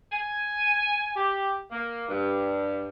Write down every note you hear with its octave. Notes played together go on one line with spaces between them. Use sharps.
G#5
G4
A#3
G2